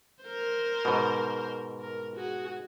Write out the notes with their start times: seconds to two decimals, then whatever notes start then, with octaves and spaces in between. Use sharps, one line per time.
0.24 A#4 C5
0.85 G#2 B2
1.80 A#4
2.16 F#4 G#4